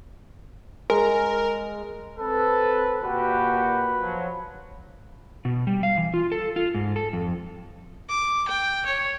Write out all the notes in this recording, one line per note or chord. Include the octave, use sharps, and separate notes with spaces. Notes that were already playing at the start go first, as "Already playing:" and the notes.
G#3 A#4
C4 A4 B4
A#2 F#4 G4 B4
F3 F#3
B2
G3
F5
E3
F4
A4
F4
G#2
A4
F2
D6
G5
C#5